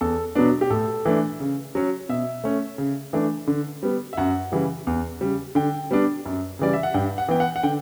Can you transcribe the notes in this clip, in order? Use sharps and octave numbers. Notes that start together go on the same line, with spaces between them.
E2 A4
B2 F#3 B3 D4
G4
A2 A4
E3 A3 D4
C#3
F#3 C#4
B2 E5
A3 C#4
C#3
E3 A3 D4
D3
G3 B3
E5
F#2 F#5
C#3 E3 G3
E2
C#3 G3
D3 G5
G3 B3 D4
F#2
C#3 E3 G3 D5
E5
F#5
G2 G5
F#5
E3 B3 G5
F#5
F#5
D3 G5